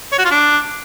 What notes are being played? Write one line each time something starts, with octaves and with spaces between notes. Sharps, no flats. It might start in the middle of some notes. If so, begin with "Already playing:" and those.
C#5
F#4
F4
D4